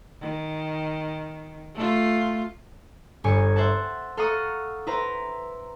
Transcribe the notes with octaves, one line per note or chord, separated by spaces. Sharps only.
D#3
A3 F4
G1 G2 C#5 G#5 C#7
C5 E5 F#5 A5
A4 F5 F#5 A#5 C#6 D#6
E4 B4 C5 A#5